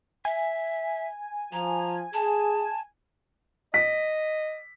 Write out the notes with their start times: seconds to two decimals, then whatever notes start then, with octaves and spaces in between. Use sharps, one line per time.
0.25 E5 G#5
1.52 F3 A#5
2.14 G#4 A5
3.74 D#5 B6